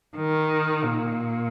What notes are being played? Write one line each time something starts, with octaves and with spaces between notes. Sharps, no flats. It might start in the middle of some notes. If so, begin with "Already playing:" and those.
D#3
A#2